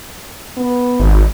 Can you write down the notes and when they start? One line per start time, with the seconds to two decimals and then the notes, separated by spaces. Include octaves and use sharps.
0.57 B3
1.00 G#1